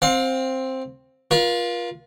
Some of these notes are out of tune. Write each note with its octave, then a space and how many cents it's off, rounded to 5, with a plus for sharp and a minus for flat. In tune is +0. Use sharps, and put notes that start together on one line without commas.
C4 +5 F5 +35
F4 +0 A#4 +45